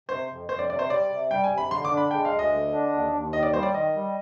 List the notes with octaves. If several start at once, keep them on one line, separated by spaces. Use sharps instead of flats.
C3 C5
F2
F2 C5
D5
C3 D5
C5
G3 D5
C3
G3 G5
G#5
C3
B5
D3 C6
D6
D4
B5
G#3 G5
F5
D2
D#5
D3
D4
D#2
D#2
D#3 D#5
D5
G3 C5
D5
D#3 D#5
G3